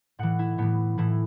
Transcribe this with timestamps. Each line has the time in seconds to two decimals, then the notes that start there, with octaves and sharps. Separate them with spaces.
0.19 A2 E3 F#5
0.39 E4
0.58 A2 E3 B3
0.98 A2 E3 E4